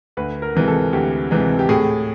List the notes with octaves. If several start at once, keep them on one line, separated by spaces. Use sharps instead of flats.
D2 B4
A#4
C3 E3 G#3
A4
D2 G4
C3 E3 G#3
G4
A2 G#4